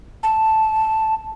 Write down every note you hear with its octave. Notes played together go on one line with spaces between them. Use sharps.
A5